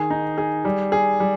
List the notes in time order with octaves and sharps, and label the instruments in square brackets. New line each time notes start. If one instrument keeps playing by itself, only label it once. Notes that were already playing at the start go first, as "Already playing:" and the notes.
Already playing: [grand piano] D#3 G#4
D#4
G#4
G3
G#4
G3